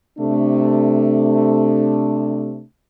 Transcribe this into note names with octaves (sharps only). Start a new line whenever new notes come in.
C3 A3 D4